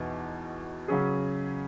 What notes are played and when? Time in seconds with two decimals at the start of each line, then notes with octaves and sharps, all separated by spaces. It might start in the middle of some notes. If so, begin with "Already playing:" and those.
Already playing: E2 B2 D#4
0.88 C#3 F#3 C#4 G#4